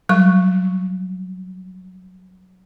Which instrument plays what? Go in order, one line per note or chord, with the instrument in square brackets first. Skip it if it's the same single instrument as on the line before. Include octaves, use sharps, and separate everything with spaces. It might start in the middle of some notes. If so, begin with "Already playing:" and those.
[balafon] F#3 G3 C#6